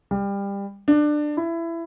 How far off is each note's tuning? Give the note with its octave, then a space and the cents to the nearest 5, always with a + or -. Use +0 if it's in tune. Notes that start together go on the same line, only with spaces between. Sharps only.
G3 +25
D4 +20
E4 +20